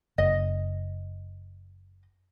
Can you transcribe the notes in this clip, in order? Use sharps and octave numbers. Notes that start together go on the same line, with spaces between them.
F#1 D#5